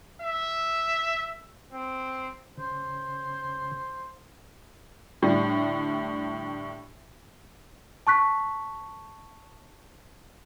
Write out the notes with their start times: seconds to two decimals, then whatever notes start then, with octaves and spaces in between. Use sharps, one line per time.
0.22 E5
1.73 C4
2.58 C#3 C5
5.22 A2 D3 G3
8.07 A5 C#6 F#6 B6